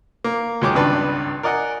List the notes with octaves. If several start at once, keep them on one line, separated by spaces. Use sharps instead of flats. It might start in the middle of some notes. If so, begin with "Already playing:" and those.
A#3
D#2 F#3 G#3 C#5 G5 D6
G#1 C#2 G2 B4 D5 A5
A#4 D5 D#5 F#5 G#5